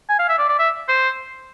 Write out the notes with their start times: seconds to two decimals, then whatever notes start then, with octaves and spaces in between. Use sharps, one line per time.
0.09 G#5
0.19 F5
0.29 E5
0.38 D5
0.49 D5
0.59 E5
0.89 C5